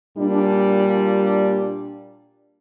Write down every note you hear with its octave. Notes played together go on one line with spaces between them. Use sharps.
A#2 G3 D4